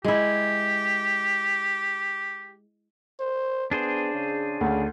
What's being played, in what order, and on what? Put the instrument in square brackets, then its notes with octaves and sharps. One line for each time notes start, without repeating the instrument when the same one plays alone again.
[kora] G#3 E4 [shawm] G4
[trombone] C5
[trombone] B3 [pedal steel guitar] D4 G#4 C5
[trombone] C#3
[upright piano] D2 [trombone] C#3